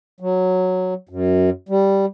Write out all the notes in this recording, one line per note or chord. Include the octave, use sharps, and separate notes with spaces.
F#3
F#2
G3